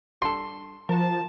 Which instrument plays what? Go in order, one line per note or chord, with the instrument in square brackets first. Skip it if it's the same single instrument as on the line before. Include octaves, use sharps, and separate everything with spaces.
[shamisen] G3 D4 A4 [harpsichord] C6
[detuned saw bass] F3 [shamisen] F#4 A#4 [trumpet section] A5